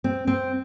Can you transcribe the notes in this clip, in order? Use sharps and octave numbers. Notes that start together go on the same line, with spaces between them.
C4
C4